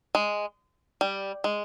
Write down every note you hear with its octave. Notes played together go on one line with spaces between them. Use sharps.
G#3
G3
G#3